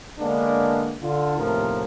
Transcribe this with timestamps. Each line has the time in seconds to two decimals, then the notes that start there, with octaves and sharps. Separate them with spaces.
0.19 D3 G#3 A#3 B3 D4
1.02 D3 F4
1.37 D#2 A2 C3 F3 B3 A#4